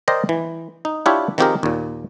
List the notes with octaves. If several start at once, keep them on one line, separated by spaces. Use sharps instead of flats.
A#4 C5 D5 D#5 G5 A#5
E3
D#4
D4 E4 F4 G4 C#5 E5
D#3 F3 C4 G4 G#4 A#4
D#2 A#2